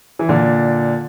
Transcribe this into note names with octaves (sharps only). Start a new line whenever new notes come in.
E3
A#2 D3